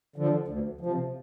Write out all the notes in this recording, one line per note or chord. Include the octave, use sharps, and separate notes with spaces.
D3 F3
D2
F3
C3